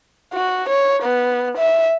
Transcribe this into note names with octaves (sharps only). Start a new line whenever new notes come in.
F#4
C#5
B3
E5